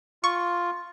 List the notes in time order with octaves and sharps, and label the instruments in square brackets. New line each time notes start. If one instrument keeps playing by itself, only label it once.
[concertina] F4 [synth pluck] C#6